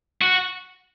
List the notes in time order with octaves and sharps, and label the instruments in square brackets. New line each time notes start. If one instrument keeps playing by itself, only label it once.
[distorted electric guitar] F#4